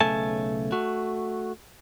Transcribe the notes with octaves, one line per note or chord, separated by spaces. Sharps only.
B1 C#3 A3 G#5 A5
A3 F#4